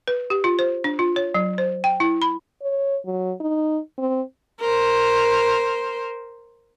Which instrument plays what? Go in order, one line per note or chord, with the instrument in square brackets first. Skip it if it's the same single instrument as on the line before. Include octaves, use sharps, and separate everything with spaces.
[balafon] B4
G4
F4
C5
D4
F4
C#5
F#3
C5
G5
E4
B5
[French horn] C#5
F#3
D#4
C4
[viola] A#4 C5